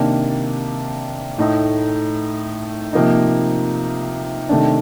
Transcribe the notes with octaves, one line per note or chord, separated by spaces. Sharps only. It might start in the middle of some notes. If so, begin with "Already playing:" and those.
Already playing: C3 D#3 A#3 D4
A2 A3 D#4
C3 F3 A#3 D#4
C3 D#3 A3 D4